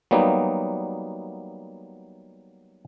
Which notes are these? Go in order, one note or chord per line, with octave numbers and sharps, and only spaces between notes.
F#3 G3 A#3 B3 D#4